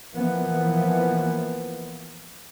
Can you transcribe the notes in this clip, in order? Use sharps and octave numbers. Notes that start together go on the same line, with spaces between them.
E3 F3 A#3 B3